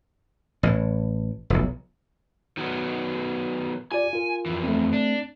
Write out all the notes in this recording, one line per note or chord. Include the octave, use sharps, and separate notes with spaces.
A1 A2
F1 B1
D#3 F#3 B3
F4 G4 D5 G#5
F4 A#4
F2 E3
A3 C4
D4